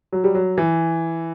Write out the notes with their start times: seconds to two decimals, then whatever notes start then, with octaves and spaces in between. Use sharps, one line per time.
0.12 F#3
0.24 G3
0.35 F#3
0.58 E3